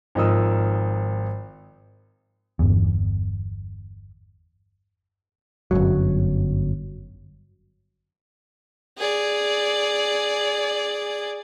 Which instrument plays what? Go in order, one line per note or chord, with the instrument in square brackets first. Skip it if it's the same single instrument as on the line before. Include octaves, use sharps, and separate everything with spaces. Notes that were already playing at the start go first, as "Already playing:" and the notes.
[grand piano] G#1 F3 D#4 A#4 D#6 E6
[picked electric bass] G1 E2
G1 C2 F#2 F#3
[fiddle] G#4 D5